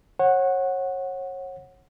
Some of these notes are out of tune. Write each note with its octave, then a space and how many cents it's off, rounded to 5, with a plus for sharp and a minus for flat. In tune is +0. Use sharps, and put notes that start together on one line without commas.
C#5 -30 F#5 +0